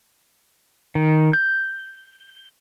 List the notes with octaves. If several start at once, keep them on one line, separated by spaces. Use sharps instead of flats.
D#3
G6